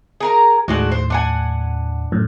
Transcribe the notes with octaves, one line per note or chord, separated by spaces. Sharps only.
G#4 A#4 A#5
D#2 A2 G#3 D4 F#4
C5
D4 F#5 G#5
F#2 A2